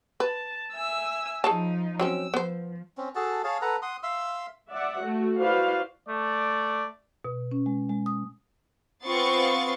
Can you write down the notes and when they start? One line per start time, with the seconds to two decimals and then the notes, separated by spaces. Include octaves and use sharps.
0.20 B4 A5 A6
0.73 E5 G#5 E6
1.44 F3 D#4 G#4 C#5 A5
2.00 F#3 C4 C#4 E6
2.34 F3 B3 C5
2.97 C4 C#4
3.15 F#4 G#4 A4 A5
3.44 G#4 C#5 F5 A5
3.61 A4 B4 F#5 A#5
3.82 F#5 C6 D#6
4.03 E5 F5 C6 E6
4.71 D5 E5 F#5
5.01 A3 F#4
5.39 E4 F#4 B4 C5 D5 F5
6.08 A3 D5
7.25 B2
7.52 C#4
7.66 G#3
7.89 G#3
8.06 D#6
9.06 B3 C4 F4 C6 C#6 A6